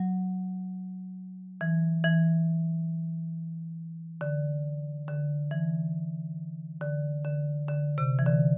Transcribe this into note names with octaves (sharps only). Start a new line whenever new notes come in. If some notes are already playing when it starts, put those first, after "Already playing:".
Already playing: F#3
E3
E3
D3
D3
E3
D3
D3
D3
C3
E3
D3